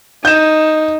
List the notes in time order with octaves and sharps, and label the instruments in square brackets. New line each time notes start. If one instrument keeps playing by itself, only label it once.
[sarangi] D#4 [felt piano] G6 E7